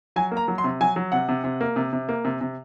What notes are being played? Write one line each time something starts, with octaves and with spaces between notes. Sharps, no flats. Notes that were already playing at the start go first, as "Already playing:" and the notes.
F#3 G#5
A#3
A#5
F#3
C6
C3
F#3 G#5
F#3
C3 F#5
C3
C3
A#3
C3
C3
A#3
C3
C3